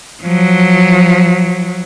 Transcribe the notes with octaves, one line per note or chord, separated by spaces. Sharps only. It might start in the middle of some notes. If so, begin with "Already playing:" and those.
F3 F#3